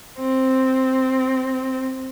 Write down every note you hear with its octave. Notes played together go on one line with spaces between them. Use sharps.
C4